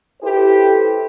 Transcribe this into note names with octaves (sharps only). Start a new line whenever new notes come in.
E4 G4 A4 B4 C5